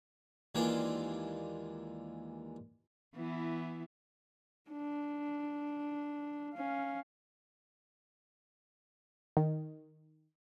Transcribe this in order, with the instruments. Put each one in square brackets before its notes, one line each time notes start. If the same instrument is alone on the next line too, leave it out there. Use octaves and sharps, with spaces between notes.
[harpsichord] D#2 E3 G#3 D4 F4 G5
[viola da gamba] E3 B3 E4
[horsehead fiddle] D4
C#4 F5
[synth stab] D#3